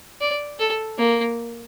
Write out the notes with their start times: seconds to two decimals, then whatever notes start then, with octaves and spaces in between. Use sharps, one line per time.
0.21 D5
0.60 A4
0.98 A#3